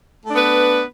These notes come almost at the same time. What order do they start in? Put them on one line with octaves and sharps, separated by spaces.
A3 D4 B3 B4